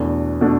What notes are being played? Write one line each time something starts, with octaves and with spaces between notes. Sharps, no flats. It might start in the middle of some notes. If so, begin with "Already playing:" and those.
Already playing: E2 B2 A3 D4
B2 A3 D4